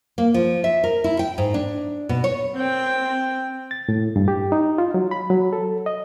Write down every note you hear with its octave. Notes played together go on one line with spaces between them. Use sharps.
A#3
F3
E5
A#4
E4
G5
G#2
D4
B2
C#5
C4 G5
A6
A2
G2
G4
D#4
F4
F#3
B5
F#3
A4
D#5